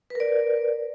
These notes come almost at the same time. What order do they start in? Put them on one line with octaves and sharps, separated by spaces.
B4 A#4 D5